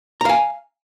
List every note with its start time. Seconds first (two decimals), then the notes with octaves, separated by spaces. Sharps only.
0.21 A#5
0.25 F5
0.29 G#5